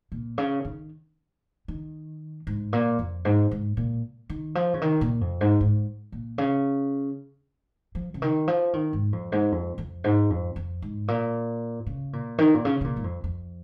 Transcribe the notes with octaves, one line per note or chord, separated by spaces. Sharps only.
A#2
C#3
D#3
D#3
G#2
A#2
F2
G#2
G#2
A#2
D#3
F3
C#3
D#3
A#2
F2
G#2
G#2
A#2
C#3
F3
C#3
D#3
F3
D#3
G#2
F2
G#2
F2
F2
G#2
F2
F2
G#2
A#2
C#3
A#2
D#3
A#2
C#3
C#3
A#2
G#2
F2
F2